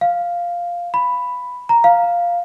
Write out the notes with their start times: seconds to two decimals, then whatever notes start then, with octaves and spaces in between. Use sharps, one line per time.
0.01 F5
0.94 B5
1.69 A#5
1.84 F5